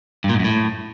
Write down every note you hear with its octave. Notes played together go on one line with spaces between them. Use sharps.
G2
A#2
G#2
F#2
A2